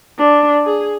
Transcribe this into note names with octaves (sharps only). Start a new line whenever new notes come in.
D4
G#4